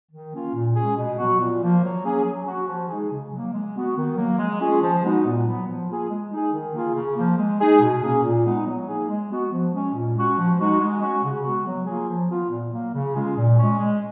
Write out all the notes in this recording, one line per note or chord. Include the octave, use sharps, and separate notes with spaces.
D#3
A#3 C#4 F4
A#2
G#3 C#4 G#4
B2
F#3 B3 F#4
A#2
F3 A#3
F#3
A#3 C#4 G#4
F#3
C#4 F#4
F3
G#3 D#4 G#4
C#3
F#3 A#3
G#3
B3 F#4
D#3
F#3 A#3
G#3
C#4 F4 G#4
F3
G#3 B3 D#4 F#4
A#2
F#3 B3
F3
A#3 F4 G#4
G#3
D#4 G#4
D#3
A#3 F4 G#4
C#3
F3 A#3
G#3
D#4 G#4
B2
A#3 C#4 G#4
A#2
G#3 B3 D#4
F#3
A#3 D#4 G#4
G#3
B3 F#4
F3
G#3 C#4
A#2
G#3 C#4 F#4
F3
G#3 D#4 F#4
G#3
C#4 F#4
C#3
G#3 B3 F#4
F#3
A#3 F4 G#4
F3
B3 F4
A#2
F#3 A#3
C#3
G#3 C#4 F4 G#4
A#2
G#3 C#4
G#3